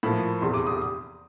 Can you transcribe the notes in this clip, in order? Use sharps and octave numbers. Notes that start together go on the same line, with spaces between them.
A2 F3 A#3 B5
F1 E2 C3 C6
D6
D#6